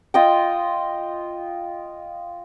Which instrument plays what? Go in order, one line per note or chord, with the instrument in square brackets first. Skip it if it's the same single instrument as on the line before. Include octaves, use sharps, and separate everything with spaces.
[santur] F4 D#5 G5